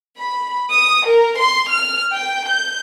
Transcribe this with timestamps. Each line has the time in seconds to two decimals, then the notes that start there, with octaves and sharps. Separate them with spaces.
0.18 B5
0.72 D#6
1.06 A#4
1.39 C6
1.70 F6
2.13 G5
2.49 G6